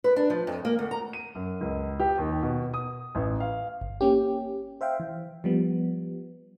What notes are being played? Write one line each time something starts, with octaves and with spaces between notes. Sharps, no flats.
B4
D4
F3
F2
A#3
D2
A#5
D#7
F#2
C#2
G4
D#2
B2
D#6
A1
F5
G1
A#3 C#4 G4
C5 E5 F5 G5
E3
F3 G3 B3